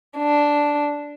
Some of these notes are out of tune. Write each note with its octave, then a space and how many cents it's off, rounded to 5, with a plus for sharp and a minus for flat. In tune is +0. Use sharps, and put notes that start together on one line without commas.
D4 -5